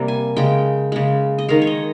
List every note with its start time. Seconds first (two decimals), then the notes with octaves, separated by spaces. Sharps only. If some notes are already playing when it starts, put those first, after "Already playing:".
Already playing: C3 G3 A#3
0.08 G#5
0.36 C#3 G#3 G5
0.92 C#3 G#3
1.38 D#5
1.49 D#3 G#3 F5
1.62 C#5
1.67 D#5